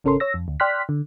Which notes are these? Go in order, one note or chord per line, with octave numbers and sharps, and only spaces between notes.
G#1 C#3 C#4 A4 A#4 C6
C#5 E6 A#6
F2
D2
D5 G5 C6 F6 F#6 B6
D3